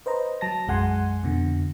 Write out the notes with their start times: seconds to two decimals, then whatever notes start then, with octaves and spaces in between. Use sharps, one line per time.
0.06 B4 C5 D#5 A#5
0.41 F#3 A5 A#6
0.67 B1 F#2 G#3 F#5 G#5 C6
1.23 F2 B2 D3